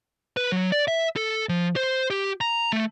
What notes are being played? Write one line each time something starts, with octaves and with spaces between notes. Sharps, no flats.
B4
F#3
D5
E5
A4
F3
C5
G4
A#5
A3